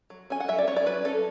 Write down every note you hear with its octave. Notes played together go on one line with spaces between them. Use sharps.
F#3
C#4 G#5
F#5
F#3 E5
D5
C#4 C#5
D5
F#3 B4
C#4 A4